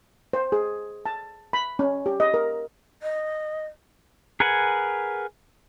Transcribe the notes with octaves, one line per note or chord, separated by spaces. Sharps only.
C5
G#4
A5
B5
C#4
G4
D#5
A#4
D#5
G#4 A#4 B4 F#5 G#5